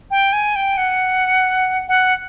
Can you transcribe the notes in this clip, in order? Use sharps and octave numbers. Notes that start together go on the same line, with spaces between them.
G5
G#5
G5
F#5
F#5